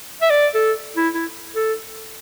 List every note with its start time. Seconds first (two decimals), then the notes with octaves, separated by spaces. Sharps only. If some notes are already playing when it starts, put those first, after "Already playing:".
0.22 E5
0.30 D5
0.55 A4
0.97 E4
1.14 E4
1.55 A4